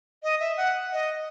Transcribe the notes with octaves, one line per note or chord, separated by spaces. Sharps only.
D#5
E5
F#5
D#5